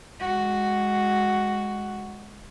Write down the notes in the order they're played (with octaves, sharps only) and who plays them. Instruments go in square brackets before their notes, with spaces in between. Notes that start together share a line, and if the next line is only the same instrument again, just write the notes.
[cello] G#3 F#4